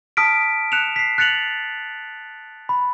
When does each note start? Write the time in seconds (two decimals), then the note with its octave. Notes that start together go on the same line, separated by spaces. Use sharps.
0.17 A5 D#6 F6 B6 D7
0.72 F#6 C#7 E7 F7
0.96 B6 C7
1.18 F#6 A6 C#7 F7 F#7
2.69 B5